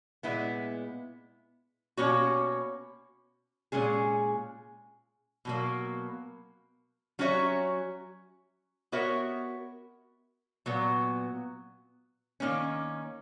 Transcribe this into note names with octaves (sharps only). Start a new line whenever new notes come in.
A#2 G#3 B3 E4
B2 A#3 C#4 F#4 C#5
A#2 G#3 C#4 G#4
B2 F#3 A#3
F#3 C#4 F#4 C#5 E5
B3 F#4 A#4 C#5 E5
A#2 F#3 B3
D#3 A#3 C#4